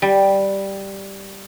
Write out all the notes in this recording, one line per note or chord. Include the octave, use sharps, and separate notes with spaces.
G3